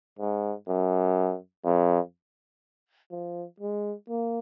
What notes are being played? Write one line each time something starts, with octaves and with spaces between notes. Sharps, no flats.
G#2
F#2
F2
F3
G#3
A#3